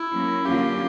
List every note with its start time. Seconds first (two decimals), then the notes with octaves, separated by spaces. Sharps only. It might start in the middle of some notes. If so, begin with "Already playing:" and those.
Already playing: E4
0.12 F#3 A#3 C#4
0.45 D3 F#3 A#3 C#4 F4 G4